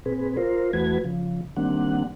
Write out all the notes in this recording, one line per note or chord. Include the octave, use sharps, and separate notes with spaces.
A#2 C4 G#4 B4
F4 A#4 C5
E2 E3 A3 F#4 B4 G#6
C#3 F3
D#3 G3 A#3 C4 D4 F#5